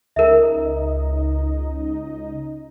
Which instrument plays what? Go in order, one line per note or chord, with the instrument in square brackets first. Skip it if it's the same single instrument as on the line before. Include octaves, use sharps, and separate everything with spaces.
[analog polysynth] C#2 D#4 D#5 [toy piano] A#4 E5